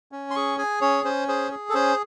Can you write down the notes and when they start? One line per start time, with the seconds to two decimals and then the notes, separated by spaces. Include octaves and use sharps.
0.12 C#4
0.31 C6
0.35 G#4 C#6
0.58 G#4 G#5
0.81 C#4 C#5
1.04 C#4 C5
1.28 G#4 C5
1.51 G#4
1.69 A4
1.74 C#4 C5